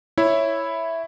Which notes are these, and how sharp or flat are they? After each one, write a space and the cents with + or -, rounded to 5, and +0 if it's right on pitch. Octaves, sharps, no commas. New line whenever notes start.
E4 +0 C#5 +0 E5 +0